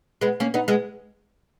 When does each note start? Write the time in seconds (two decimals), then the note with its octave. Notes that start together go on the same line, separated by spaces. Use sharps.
0.21 G#3 B3
0.40 A#3 C#4
0.54 B3 D#4
0.68 G#3 B3